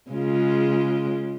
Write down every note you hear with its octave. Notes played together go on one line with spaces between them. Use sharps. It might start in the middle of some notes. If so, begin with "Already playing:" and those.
C#3 G#3 F4